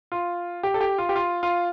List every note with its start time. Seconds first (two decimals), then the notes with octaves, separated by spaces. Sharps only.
0.12 F4
0.63 G4
0.74 A4
0.81 G4
0.98 F4
1.09 G4
1.16 F4
1.43 F4